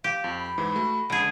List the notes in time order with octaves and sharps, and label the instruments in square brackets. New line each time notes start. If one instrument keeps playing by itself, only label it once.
[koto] G4 [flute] F5
[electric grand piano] F2
[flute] B5
[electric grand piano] G#2 E3
A3 F#4
[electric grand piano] C#2 [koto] D3 G#4